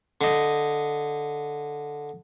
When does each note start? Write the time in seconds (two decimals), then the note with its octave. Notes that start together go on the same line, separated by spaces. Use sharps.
0.21 D3 D#5